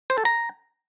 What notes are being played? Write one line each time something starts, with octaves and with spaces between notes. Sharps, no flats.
C5
A4
A#5